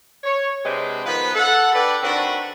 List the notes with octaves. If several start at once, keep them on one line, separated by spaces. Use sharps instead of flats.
C#5
C3 G#3 C4 D4 B4 C5
D#3 F3 B3 D#4 B4
A4 F#5
D4 A4 B4 D5 G5 B5
D#3 C4 D4 F#4 A4 B4